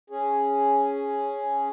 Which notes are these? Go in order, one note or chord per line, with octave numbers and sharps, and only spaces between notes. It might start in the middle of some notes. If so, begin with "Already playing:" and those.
C#4 G#4